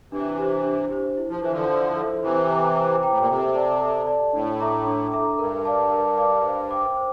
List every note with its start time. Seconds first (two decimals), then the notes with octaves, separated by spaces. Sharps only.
0.11 C3 E3 D4
0.38 G4 C5
0.64 D4
0.91 G4 C5
1.17 E4
1.29 F3
1.41 E3 A4 C5 E5
1.51 D3 F3
1.70 E4
1.96 A4 C5 E5
2.22 C3 E3 C5
2.49 G5 A#5 D6
2.76 C5
3.02 G5 A#5 D6
3.09 A2
3.19 A#2
3.28 C3 A4
3.54 D5 A5
3.80 A4
4.07 D5 A5
4.33 A2 D4
4.60 A4 E5 A#5 D6
4.86 D4
5.12 A4 E5 A#5 D6
5.39 G2 A#4
5.65 D5 F5 A5 D6
5.91 A#4
6.17 D5 F5 A5 D6
6.44 C5
6.71 G5 D6
6.97 C5